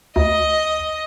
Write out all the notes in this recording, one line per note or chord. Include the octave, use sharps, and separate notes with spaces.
D2 D#5